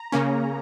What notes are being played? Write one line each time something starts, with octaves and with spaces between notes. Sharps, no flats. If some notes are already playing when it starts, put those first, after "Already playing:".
Already playing: A#5
C#3 A#3 C#4